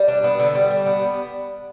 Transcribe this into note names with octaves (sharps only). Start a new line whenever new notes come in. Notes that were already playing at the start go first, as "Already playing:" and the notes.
Already playing: G3
D4
B3
D3
G3
D4
B3